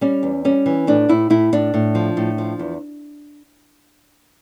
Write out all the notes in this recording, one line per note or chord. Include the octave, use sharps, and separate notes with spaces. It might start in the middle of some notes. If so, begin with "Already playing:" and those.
G3 C#4
E2
G3 C#4
E3
A2 D4
A2 E4
A2 E4
A2 D4
A2
F3
A2
F3
E2